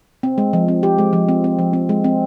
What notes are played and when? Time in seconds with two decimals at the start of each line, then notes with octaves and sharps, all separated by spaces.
0.23 C4
0.38 G#3
0.53 F3
0.68 C4
0.83 G4
0.98 G#3
1.13 F3
1.29 C4
1.44 C4
1.59 F3
1.73 C4
1.89 G#3
2.04 C4